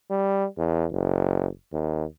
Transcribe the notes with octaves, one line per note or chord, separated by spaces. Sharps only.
G3
E2
F#1
D#2